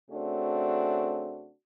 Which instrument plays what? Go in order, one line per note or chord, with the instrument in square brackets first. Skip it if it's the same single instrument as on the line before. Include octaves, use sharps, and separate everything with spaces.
[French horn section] C#3 A3 C4 D4 F#4